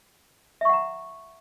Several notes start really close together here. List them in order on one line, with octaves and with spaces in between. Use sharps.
E5 C#6 F#5 A#5